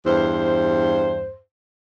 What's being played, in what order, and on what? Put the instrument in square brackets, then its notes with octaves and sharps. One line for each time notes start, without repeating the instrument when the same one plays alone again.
[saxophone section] E2 G2 C5